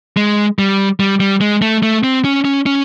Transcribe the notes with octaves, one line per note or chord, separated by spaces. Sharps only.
G#3
G3
G3
G3
G#3
A3
A3
C4
C#4
C#4
C#4